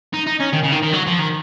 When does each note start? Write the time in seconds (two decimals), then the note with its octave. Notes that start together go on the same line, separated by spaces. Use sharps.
0.14 D#4
0.27 D#4
0.40 C#4
0.53 D#3
0.64 C#3
0.73 D#3
0.83 D#3
0.93 F#3
1.07 F3
1.19 D#3